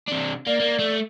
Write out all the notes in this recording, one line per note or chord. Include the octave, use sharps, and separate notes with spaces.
C3 D4
A#3 D5
A#3
A3